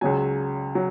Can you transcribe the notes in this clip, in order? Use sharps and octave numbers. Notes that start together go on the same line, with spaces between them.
C#2 C#3 F#3 G#5
F#3